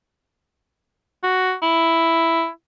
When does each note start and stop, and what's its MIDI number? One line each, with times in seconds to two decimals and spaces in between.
1.23 1.54 66
1.62 2.48 64